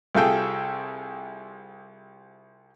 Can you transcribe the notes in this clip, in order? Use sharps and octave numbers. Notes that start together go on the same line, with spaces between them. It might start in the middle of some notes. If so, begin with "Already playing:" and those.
C2 C3 F4 G#4 A4 G5